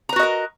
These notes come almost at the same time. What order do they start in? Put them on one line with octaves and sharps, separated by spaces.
A#5 B4 F#4 D#5 A#4